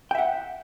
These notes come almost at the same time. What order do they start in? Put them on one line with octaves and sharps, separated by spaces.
G5 E5 F#5